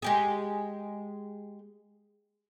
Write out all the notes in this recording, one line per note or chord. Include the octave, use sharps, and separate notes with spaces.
G#3 G4 G#4